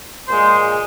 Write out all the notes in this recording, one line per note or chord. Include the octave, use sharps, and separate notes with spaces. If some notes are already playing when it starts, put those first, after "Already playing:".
A#2 G#3 C5